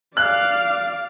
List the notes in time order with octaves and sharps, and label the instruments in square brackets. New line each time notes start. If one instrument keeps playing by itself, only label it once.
[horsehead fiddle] D5 F5 [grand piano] F#6